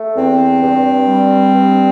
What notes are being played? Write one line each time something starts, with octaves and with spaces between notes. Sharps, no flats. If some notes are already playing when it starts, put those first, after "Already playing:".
Already playing: A3
E2 C4
G2
G3
G2